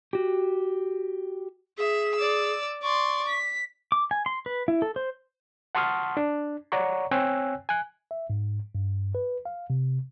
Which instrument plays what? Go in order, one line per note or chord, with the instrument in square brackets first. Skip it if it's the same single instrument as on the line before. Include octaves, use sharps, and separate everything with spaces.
[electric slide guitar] F#4 G4
[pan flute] G#4 [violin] E5
[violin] D5 E6
[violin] D5 C6 [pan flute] C#6
[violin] B6
[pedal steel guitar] D6
G#5
C6
B4
E4
A4
C5
[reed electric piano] F#5 A5 C6 C#6 D#6 F6
D4
C#5 D5 F#5 A#5 C#6
C4 C#5 G5 G#5 E6 F#6
G#5 F#6
[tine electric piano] E5
G#2
G2
B4
F5
C3